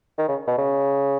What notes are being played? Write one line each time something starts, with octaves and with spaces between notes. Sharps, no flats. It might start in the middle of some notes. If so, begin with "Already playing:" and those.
D#3
C#3
B2
C#3